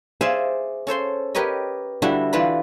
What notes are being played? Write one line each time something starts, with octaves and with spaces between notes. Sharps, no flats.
G#4 C5 D5 E5 F5 G#5
C#4 A4 C5 C6
G4 A#4 B4 C#5 D#5
D3 G3 D4 E4 F#4
E3 F4 B4 D5 B5